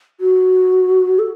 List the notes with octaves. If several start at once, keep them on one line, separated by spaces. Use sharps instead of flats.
F#4
A4